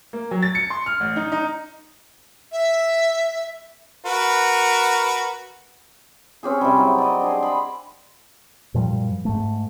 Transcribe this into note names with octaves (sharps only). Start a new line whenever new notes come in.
A#3
F#3
A6
C#7
C6
F6
A1
D#4
D#4
E5
F#4 A#4 B4
C4 C#4 G4 G#4
C3 G3
F#3 D#4 E4
D5 D#5
D4 G#4 C5
D#5 B5
F#2 A#2 F3 G3
G#2 A3